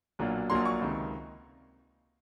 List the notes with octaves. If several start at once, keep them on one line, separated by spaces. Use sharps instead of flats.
B1 A#2 F#3 A#3 D4
A#1 A#2 F#3 A#3 D4 C6
C#6
C#2 C3 D#3